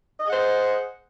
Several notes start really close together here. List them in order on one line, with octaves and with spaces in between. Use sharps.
D#5 G#4 F#5 C5